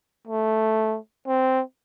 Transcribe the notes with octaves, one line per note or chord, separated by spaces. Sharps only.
A3
C4